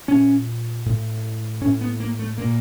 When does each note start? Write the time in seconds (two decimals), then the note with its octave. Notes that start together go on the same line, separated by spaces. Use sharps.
0.08 A#2 C#4
0.86 A2
1.61 A2 C#4
1.81 B3
2.00 A#3
2.19 A3
2.38 A#2 A#3